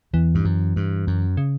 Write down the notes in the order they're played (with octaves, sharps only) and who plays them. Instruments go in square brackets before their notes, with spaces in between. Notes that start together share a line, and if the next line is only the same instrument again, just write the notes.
[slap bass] E2 [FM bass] E3
[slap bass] G2
F#2
G2
F#2
[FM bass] C#3